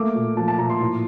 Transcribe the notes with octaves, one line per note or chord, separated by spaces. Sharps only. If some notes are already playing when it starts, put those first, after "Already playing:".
Already playing: A3 A#3 D6
A#2
F3 A5
A5
A#2 A#5
C6
A2